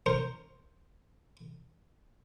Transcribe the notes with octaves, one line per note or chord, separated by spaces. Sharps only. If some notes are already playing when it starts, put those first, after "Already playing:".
A#4 C5 C#6